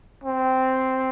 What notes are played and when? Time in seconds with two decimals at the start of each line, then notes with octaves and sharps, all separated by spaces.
0.24 C4